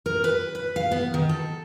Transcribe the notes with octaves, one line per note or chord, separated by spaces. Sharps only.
A#4
B4
B4
F5
B3
D#3
A4